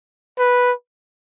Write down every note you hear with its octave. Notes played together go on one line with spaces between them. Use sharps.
B4